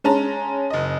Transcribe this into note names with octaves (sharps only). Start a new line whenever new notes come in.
G#3 C#4 A5 A#5
F#1 D#5